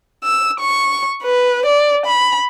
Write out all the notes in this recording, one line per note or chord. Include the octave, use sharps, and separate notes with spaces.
E6
C#6
B4
D5
B5